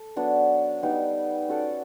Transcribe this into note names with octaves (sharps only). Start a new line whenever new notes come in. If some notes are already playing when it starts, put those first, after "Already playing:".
Already playing: A4
F#3 B3 D4
G3 B3 D#4
C#4 F#4 A4 D5